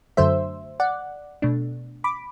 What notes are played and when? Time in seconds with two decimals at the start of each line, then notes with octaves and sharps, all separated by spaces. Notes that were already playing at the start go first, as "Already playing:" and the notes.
0.17 F#2 D3 F#3 A3 C5 E5
0.80 D5 F#5
1.42 B2 A3 D4
2.04 B5 D6